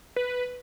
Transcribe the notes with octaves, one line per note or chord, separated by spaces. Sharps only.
B4